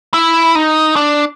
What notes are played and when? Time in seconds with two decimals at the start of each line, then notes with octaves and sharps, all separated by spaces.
0.14 E4
0.55 D#4
0.96 D4